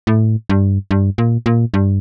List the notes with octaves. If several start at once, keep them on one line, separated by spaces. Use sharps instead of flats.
A2
G2
G2
A#2
A#2
G2